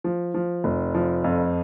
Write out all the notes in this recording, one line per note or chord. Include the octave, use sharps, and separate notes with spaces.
F3
F3
F1
F3
F2